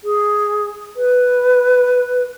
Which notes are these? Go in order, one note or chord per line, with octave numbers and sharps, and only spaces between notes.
G#4
B4